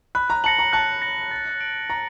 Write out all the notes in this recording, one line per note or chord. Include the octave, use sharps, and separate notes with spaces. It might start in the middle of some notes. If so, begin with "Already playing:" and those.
B5 F#6
A#5
A5 A#6 C#7 F#7
A#5
A5 F#6
A#6 C#7 F#7
A6
D7 F#7
A#5 A6